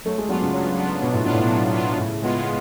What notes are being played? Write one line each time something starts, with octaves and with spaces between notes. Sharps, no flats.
F#3 A3
G#3
F#3 B3 D4 F4
C#3
F#3
B3 D4 F4
B2 F#3
A2
B2 B3 D4 F4
A2
B2
F#3
B3 D4 F4
A2 C#3
G#3 B3 F4